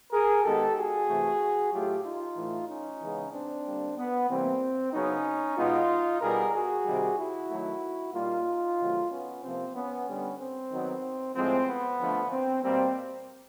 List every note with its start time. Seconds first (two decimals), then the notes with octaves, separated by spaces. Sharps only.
0.12 G#4 A#4
0.44 D#3 G#3 B3 G4 A4
0.76 F#4 G#4
1.07 C3 E3 A3
1.72 A2 F#3 A3 F4 G4
2.03 D#4 F4
2.36 A2 E3 A3
2.68 C#4 D#4
3.00 C#3 E3 G#3 B3
3.32 C4 D4
3.65 D3 G3 A#3
3.97 B3
4.29 C3 E3 G3 A#3 C4
4.93 C#3 F#3 B3 C#4 D#4
5.56 B2 G#3 B3 D#4 F4
6.21 B2 G3 B3 G#4 A#4
6.53 F#4 G#4
6.85 C3 D#3 G3
7.17 E4 F#4
7.49 D#3 F#3 A3
8.13 A#2 G3 A#3 D#4 F4
8.78 C3 D#3 F#3 A3
9.10 B3 C#4
9.42 C3 F3 A#3 C4
9.74 B3 C#4
10.07 D3 G3 B3
10.38 C4
10.70 D#3 F#3 B3
11.35 A2 F3 G#3 C4
11.67 B3
11.98 D3 F3 A3
12.31 C4
12.63 B2 G3 A#3 C4